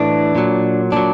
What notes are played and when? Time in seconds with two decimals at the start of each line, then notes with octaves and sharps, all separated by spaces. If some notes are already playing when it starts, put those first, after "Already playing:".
Already playing: A2 E3 D4
0.35 A#2 F#3
0.92 A#2 F#3 D4